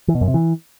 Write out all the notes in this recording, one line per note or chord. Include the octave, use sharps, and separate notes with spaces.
E3
B2
F#2
C3
E3